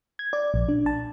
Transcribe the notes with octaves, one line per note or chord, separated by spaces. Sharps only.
G#6
D5
A#1
D4
A5